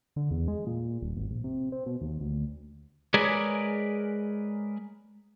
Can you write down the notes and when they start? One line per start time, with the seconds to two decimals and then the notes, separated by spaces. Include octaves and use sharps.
0.16 D3
0.31 E2
0.48 G#3
0.67 A#2
1.02 D#1
1.16 G#1
1.31 A#1
1.44 C3
1.72 C4
1.86 B2
2.01 D#2
2.20 D2
3.14 G#3 G#4 A#4 B4 C#5 D5